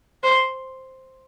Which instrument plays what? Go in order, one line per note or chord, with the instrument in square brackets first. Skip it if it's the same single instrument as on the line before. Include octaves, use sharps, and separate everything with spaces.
[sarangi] C5